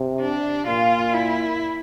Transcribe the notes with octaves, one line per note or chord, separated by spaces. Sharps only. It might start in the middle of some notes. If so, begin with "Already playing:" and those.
Already playing: C3
D4
A#2 F4
E4